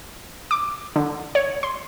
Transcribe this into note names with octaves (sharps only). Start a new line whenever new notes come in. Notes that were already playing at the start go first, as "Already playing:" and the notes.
D6
D3
C#5
C6